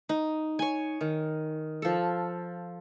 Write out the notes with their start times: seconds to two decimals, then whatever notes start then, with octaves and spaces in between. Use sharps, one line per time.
0.09 D#4
0.59 C#5 G#5
1.01 D#3
1.82 F3 A4